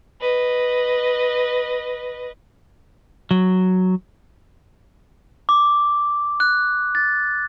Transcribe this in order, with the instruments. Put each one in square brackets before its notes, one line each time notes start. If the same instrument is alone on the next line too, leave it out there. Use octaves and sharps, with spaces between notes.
[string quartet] B4 D#5
[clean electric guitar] F#3
[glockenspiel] D6
F#6
A6